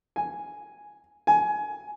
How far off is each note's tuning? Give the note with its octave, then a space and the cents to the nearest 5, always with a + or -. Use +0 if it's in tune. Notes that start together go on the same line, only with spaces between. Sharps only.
G#5 +0
G#5 +20